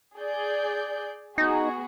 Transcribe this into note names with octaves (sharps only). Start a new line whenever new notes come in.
G#4 D5 G6
B3 D#4 F#4 G#4